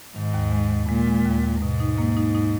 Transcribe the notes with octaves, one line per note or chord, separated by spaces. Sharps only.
G#2 D#3
D#2
G#3
D#2
A#2 G#3
G#3
D#2
D#2
G#2 B2
D#4
A#3
D#4
D#4